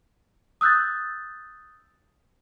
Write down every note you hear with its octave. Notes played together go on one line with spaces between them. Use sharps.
D#6 E6 F#6 G6 A6